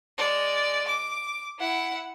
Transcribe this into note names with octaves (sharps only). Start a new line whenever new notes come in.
G#3 D5
D6
E4 F#5